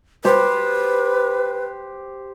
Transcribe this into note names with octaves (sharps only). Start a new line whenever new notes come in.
G4 B4 C5